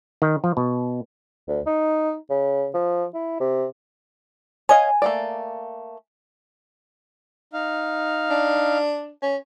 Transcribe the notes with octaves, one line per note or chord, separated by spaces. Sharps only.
D#3
F3
B2
D2
D#4
C#3
F3
E4
C3
C#5 D#5 F5 G#5
A3 A#3 D5
D#4 F5
D4
C#4